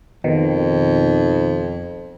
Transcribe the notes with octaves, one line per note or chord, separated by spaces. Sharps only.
F2 B2 D#3